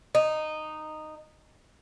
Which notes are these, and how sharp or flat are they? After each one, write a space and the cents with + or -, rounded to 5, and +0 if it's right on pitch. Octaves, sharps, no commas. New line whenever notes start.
D#4 -10